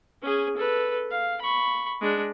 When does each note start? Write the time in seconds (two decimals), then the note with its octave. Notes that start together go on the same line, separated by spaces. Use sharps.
0.22 C#4 G#4
0.57 A4 B4
1.11 F5
1.41 B5 C#6
2.01 G#3 D4